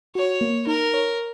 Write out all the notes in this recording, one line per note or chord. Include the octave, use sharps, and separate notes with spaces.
F#4 C#5
A#3
D#4 A#4
C#5